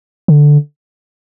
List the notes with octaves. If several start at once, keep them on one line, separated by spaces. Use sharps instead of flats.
D3